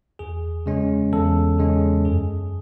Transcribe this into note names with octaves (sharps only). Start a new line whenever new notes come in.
E2 G#4
C#3 G#3 C#4
E2 A4
C#3 G#3 C#4
F#2 G#4